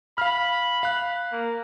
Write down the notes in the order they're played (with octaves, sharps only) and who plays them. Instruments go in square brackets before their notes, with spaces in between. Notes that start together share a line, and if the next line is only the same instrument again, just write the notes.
[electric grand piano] F5 F6 [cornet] B5
[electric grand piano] F5 F#6
[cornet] A#3